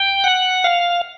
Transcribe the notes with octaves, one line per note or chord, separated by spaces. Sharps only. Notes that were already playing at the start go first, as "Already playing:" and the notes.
Already playing: G5
F#5
F5